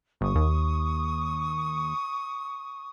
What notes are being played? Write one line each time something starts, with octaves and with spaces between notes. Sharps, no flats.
G1 C#6 D#6
D#2